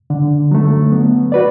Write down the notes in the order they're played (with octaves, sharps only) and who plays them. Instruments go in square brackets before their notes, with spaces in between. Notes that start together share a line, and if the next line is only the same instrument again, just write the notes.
[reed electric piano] D3
F#3 A3
B3
F#4 B4 D5